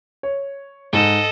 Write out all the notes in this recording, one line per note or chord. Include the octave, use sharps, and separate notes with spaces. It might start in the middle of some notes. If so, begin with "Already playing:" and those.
C#5
G#2 A4 D#5